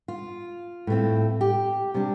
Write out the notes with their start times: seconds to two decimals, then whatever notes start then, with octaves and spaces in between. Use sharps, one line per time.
0.08 F4
0.87 A2 A3 C4
1.41 G4
1.94 C3 G3 D4